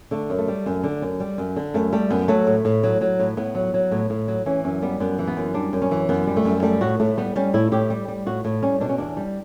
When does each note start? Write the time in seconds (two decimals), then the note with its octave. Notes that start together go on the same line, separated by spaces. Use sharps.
0.11 D3 A3
0.30 F#2
0.39 A3
0.48 G3
0.66 F#2
0.84 D3
1.02 F#2
1.20 G3
1.38 F#2
1.56 D3
1.74 F#2 A3
1.93 G3 A3
2.10 F#2 B3
2.28 F#3 A3
2.47 A2
2.65 A2
2.83 F#3
3.01 F#3
3.19 A2
3.37 A2 B3
3.55 F#3
3.74 F#3
3.91 A2
4.10 A2
4.28 F#3
4.46 E3 C#4
4.64 F#2 C#4
4.82 G3 B3
5.00 F#2 B3
5.19 E3
5.27 B3
5.37 F#2
5.54 G3 D4
5.73 F#2
5.82 C#4
5.91 E3
6.09 F#2 B3
6.27 G3
6.36 A3
6.45 F#2
6.63 G3 A3
6.81 A2 F#4
7.00 A2 A3
7.17 G3 B3
7.36 G3 C#4
7.54 A2 E4
7.72 A2 G4
7.90 G3
8.08 G3
8.26 A2 F#4
8.45 A2
8.63 G3 C#4
8.81 B2 D4
8.89 C#4
8.98 E2 D4
9.17 G3